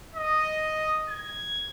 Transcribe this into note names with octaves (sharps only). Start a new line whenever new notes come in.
D#5
G#6